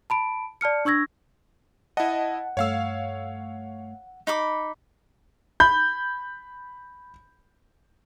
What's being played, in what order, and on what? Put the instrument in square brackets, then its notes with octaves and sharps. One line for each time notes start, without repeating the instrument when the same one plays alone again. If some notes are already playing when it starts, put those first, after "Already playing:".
[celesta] A5 B5 D7
D5 A5 F6 C#7
D4 C#6 E6 G#6 A#6
[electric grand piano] E4 D#5 [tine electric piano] F#5 [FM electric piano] A5
[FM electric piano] G2 A3 [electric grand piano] C#5 F5 E6
[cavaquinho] D#4 B5 D6
[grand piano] B5 G6